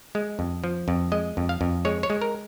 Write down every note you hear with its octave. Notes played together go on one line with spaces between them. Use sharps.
G#3
F2
F3
F2
G#3 D#5
F2
F5
F2
G#3 C#5
C#5
G#3
A#4